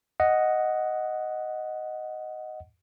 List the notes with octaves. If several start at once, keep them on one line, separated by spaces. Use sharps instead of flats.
D#5 F#5